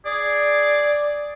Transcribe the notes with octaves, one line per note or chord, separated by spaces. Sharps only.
G#4 D5